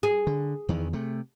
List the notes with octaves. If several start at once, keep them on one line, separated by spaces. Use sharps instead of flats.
G#4
D3
E2 D#3 E3
C3 A3